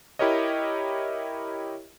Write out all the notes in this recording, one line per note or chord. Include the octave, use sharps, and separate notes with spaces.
E4 G4 A#4 C#5 D#5